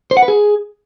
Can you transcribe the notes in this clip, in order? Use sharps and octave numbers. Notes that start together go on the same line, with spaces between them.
C5
F#5
B4
G#4